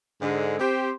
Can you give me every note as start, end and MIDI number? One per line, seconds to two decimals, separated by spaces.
0.21 0.59 44
0.21 0.59 50
0.21 0.59 56
0.60 0.91 60
0.60 0.91 67
0.60 0.91 72